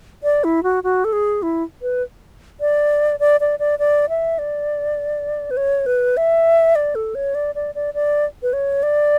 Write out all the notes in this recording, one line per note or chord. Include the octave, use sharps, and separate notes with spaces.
D5
E4
F#4
F#4
A4
G#4
E4
B4
D5
D5
D5
D5
D5
E5
D5
B4
C#5
B4
E5
D5
A4
C#5
D5
D5
D5
D5
B4
C#5
D5